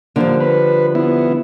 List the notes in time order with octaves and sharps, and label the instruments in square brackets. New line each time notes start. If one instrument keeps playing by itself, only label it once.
[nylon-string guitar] D3 F3 G3 [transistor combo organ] A#3
[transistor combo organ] B4
B3 E4